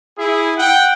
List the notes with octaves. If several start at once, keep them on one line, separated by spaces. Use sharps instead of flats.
E4 G#4
F#5 G5